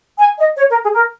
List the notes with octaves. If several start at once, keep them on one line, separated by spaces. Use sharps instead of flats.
G#5
D#5
C#5
A#4
G#4
A#4